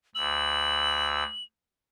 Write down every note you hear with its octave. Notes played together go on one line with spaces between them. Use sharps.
D2 E6 F#7